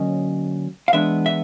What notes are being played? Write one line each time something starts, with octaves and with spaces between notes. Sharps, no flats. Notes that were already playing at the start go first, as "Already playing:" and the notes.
Already playing: D3 F#3 A#3 C#4 D#5
F5
E3 G#3 B3 D4 E5
E5